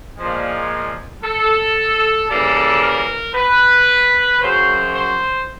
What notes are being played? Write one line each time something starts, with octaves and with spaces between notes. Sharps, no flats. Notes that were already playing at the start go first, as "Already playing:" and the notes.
A#2 F3 G#3
A4
C#3 E3 G3 A#3 A4
A#4
B4
F#2 C#3 F#3 C5
C5